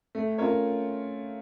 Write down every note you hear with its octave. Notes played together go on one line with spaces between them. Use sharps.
A3
C#4 F4 A#4 C#5